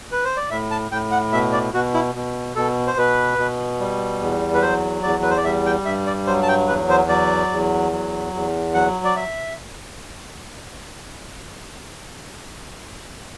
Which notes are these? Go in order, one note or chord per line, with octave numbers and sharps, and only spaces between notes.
B4
C5
D5
A2 E5
A5
A2 G5
F#5
B2 E5
D5
B2 F#4
E4
B2
B2 A4
C5
B2 B4
B2
G3
E2
B4
F#3 C5
E2 D5
B4
C5
D5
G3 E5
G5
G2 E5
D5
F#3 C5
A5
G5
E2 B4
C5
F#3 D5
E2
F#3
E2
F#3 F#5
D5
E5